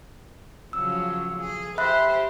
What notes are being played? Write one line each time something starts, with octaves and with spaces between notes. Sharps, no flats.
C#3 F3 F#3 E6
G#4
G4 C5 E5 B5 F#6